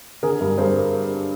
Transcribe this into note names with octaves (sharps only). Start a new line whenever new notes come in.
D3 G#4 A#4
G2
G2 A#4 C5